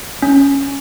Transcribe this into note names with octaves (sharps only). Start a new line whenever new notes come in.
C#4